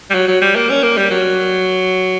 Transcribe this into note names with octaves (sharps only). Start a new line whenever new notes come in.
G3
F#3
F#3
G3
A#3
C#4
A#3
G3
F#3